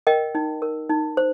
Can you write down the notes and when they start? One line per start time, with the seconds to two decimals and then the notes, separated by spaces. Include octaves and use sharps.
0.07 A#4 D#5 G5
0.35 D#4
0.62 A#4
0.90 D#4
1.17 C5